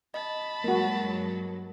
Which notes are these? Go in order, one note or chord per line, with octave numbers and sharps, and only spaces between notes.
D#5 A5 B5
G2 F#3 G#3 A#3 F#4 A#4